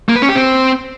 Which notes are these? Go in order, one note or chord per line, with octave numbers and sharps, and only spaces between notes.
A#3
B4
C#4
G4
C4